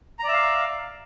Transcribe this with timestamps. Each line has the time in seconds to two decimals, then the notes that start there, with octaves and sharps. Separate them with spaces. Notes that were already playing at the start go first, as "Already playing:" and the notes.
0.19 A#5
0.24 D5
0.28 E5
0.33 F5